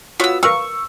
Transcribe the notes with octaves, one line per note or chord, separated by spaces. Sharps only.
B3 F4 F#4 C#5 E6
A#4 B4 F5 C#6 E6